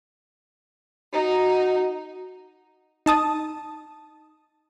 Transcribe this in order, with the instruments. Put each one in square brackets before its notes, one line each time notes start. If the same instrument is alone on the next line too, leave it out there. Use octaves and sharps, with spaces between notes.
[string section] D#4 [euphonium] F#4
[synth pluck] D#4 A5 D#6